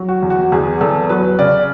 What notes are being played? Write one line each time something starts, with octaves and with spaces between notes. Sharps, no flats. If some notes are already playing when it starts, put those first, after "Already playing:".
Already playing: F#3
F#4
E2
F#4
E2 G#4
E2 A4
F#3 B4
C#3 D5